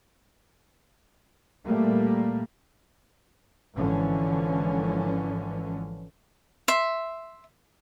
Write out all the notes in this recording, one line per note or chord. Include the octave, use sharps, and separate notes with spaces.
A#2 G3 A3 A#3
G#1 D3 E3 F3 C#4
E5 C6